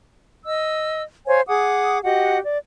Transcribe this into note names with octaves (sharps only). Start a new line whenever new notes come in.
D#5 E6
C5 C#5 F5 G#5
G#4 F#5 D6 D#6
F#4 G4 D#5 F#5
D5